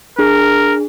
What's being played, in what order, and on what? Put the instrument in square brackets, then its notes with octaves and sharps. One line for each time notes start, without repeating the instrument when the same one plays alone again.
[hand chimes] D4 G#4 [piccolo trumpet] A#4